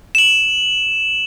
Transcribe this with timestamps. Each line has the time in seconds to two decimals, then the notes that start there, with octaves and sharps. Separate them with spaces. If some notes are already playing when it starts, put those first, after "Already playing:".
0.15 E7 F#7